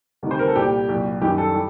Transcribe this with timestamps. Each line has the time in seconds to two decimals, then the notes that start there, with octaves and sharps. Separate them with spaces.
0.23 D2 C3 D#3 G3
0.31 C5
0.39 A#4
0.47 A4
0.56 C2 A#2 G3 G4
0.89 C2 A#2 F#3
1.21 F#2 D#3 G3 G4
1.38 A4
1.54 G3